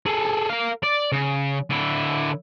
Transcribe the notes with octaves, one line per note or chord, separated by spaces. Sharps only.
G#4 A4
A#4 F5
D5
C#3
D3 E4